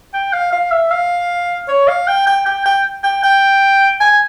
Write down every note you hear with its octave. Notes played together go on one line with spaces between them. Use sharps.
G5
F5
F5
E5
F5
C#5
F5
G5
G5
G5
G5
G5
G5
G#5